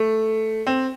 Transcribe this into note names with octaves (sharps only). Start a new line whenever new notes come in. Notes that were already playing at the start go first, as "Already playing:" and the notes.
Already playing: A3
C4